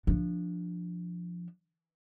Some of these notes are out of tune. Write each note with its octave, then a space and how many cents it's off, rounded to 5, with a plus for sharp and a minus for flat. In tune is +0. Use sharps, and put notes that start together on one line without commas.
F3 +0 D4 +0